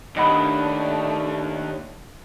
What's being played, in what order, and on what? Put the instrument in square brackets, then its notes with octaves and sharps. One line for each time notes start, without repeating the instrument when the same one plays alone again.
[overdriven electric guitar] D#2 [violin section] A3 D4 [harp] D#5 F#5 B5